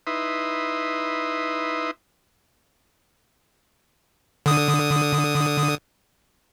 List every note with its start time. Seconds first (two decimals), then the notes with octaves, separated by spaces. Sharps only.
0.07 D#4 E4 B4 E5 C6 D#6
4.46 D3 D#6